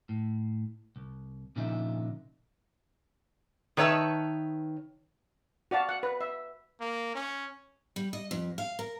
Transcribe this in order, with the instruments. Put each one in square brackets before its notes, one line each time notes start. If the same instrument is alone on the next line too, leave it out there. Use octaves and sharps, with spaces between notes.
[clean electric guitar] A2
C2
A#2 C#3 F3 D4 D#4 E5
[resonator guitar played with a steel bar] D#3 B4 C#5 E5 A5
[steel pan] F#4 D5 F5 A5
F#5
B4
E5
[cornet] A#3
C#4
[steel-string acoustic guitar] G3
D#5
F2
F5
A#4